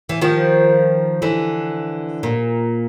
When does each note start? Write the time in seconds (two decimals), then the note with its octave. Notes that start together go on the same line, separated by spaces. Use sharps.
0.09 E3
0.21 D#3 F3
1.22 D3 E3
2.23 A#2